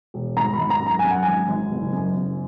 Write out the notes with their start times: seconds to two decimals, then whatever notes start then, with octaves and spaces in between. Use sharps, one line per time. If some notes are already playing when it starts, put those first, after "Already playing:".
0.14 E1
0.36 G#1 A#5
0.53 B5
0.59 G#1
0.70 A#5
0.81 F#2
0.87 A#5
0.99 G#5
1.04 F#2
1.11 F#5
1.23 G#1 G#5
1.48 G#1
1.71 F#1
1.93 F#2
2.16 F#1